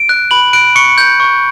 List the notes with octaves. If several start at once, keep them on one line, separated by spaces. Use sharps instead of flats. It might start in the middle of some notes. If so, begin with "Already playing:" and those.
Already playing: D7
F#6
B5 F#7
F#6 D7
C#6 C#7
G6
C#6